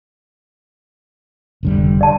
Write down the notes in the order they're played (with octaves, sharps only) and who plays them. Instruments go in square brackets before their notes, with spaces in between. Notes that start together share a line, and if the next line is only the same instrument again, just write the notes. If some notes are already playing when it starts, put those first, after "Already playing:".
[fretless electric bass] F1 D3 G3
[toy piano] D5 A5